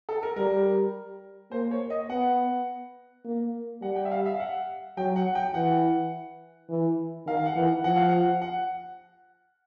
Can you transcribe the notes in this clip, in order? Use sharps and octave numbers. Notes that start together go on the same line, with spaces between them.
A4
A#4
G3 A#4
A#3 C5
C#5
D#5
B3 F#5
A#3
G3 F#5
G5
E5
F5
E5
F5
F#5
F#3 G5
F#5
G5
E3 F#5
E3
D#3 F5
F5
F#5
E3
F#5
F3 F#5
F5
F#5
F#5